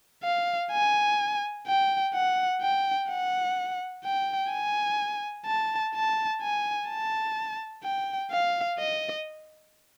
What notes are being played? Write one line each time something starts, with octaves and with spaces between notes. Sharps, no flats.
F5
G#5
G5
F#5
G5
F#5
G5
G#5
A5
A5
G#5
A5
G5
F5
D#5